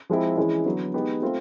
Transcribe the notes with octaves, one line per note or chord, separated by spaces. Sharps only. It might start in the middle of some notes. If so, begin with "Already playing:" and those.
F3 G#3 C4 E4
E3 G#3 C#4 E4
D3 F#3 B3
G#3 B3 D#4 G4
A3 C4 F4